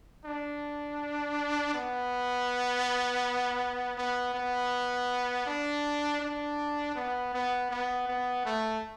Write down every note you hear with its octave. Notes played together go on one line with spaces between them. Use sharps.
D4
B3
B3
B3
D4
D4
B3
B3
B3
B3
A3